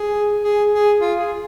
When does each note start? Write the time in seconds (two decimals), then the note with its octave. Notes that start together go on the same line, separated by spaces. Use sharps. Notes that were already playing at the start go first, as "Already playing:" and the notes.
Already playing: G#4
0.44 G#4
0.72 G#4
1.00 F4
1.18 G#4